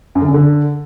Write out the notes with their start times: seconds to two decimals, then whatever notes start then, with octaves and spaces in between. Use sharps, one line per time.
0.15 F#2
0.22 D3
0.28 F#2
0.34 D3